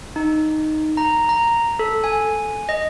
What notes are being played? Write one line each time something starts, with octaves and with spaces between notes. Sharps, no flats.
D#4
A#5
A#5
A4
G#5
D#5